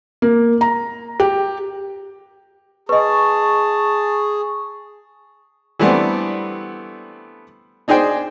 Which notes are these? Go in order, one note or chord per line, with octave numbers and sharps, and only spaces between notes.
A#3
A#5
G4
G#4 B4 D#5 A5 C#6
E3 G3 A3 B3 C4 D4
D4 D#4 G#4 C5 G5